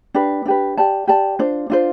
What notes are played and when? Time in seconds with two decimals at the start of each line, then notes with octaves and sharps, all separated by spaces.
0.14 D4 G4 B4
0.46 D4 G4 B4
0.77 G4 D5 A5
1.08 G4 D5 A5
1.39 D4 F4 C5
1.70 D4 F4 C5